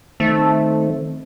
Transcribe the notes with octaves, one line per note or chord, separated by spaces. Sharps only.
D#3 A3 C4